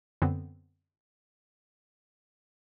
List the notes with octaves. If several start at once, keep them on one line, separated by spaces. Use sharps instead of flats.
F#2 D3 B3 C4